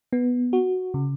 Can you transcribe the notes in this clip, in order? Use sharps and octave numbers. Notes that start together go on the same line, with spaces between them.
B3
F#4
C#3